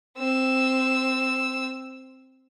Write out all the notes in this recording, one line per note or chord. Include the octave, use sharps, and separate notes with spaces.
C4 E6